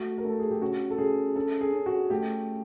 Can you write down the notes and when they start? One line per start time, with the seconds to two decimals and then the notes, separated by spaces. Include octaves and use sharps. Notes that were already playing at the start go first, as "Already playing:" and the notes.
Already playing: A3 F#4
0.18 A#4
0.24 A3 A4
0.39 G#4
0.51 G4
0.62 C#3 F#4
0.90 A4
0.98 C#3 G#4
1.36 C#4 A4
1.61 G#4
1.73 C#4
1.86 F#4
2.10 A3 G4